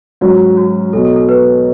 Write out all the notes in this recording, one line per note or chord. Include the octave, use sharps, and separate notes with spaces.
G#2 F#3 C#4 F#4
F#4
B1 B2 F#3 A4
A4
A4
B4